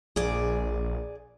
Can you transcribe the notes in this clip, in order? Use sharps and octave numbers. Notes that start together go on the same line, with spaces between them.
A#1 G#4 D5